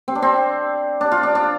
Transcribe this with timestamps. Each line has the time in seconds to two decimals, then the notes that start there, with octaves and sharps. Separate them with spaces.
0.08 C4
0.15 D4
0.22 C4
1.01 D4
1.12 F4
1.23 D4
1.35 D4